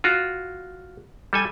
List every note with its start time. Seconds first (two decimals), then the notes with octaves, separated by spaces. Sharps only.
0.04 F4 F#4
1.33 G3 A4 G#5